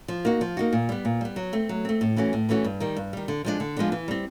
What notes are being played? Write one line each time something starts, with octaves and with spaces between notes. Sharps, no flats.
F3
A#3 D#4 F#4
F3
A#3 D#4 F#4
A#2
G3 B3
A#2
G3 B3
F#3
A3 C4
F#3
A3 C4
A2
E3 A3 C#4 F#4
A2
E3 A3 C#4 F#4
G2
D#3 G3
G2
D#3 G3
D3
F3 G#3 B3 D4
D3
F3 G#3 B3 D4
E3
G3 C4